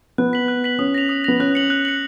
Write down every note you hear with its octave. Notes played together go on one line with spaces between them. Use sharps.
B3 F#6
B6 F#7
F#6
B6 F#7
C#4 D#6
A#6 F7
D#6
B3 A#6 F7
C#4 F#6
C#7 F#7
F#6
C#7 F#7